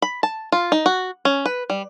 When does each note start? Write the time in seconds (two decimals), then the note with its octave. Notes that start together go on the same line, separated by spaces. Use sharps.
0.02 B5
0.23 A5
0.52 F4
0.72 D#4
0.86 F#4
1.25 C#4
1.46 B4
1.70 G3